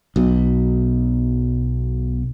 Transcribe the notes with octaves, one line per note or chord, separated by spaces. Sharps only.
B1 B2